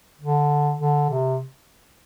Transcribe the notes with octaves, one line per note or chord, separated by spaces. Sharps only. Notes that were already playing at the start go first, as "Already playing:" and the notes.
D3
D3
C3